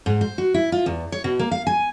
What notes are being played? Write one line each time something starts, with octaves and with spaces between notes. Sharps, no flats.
G#2
C5
F#4
E4
F4
E2
C#5
B2
A#3
F5
G#5